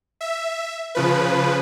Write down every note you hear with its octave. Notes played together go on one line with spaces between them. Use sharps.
E5
C#3 F3 B4